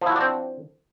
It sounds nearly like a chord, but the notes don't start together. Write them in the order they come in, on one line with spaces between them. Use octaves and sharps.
F3 E4 F#4 D4 C4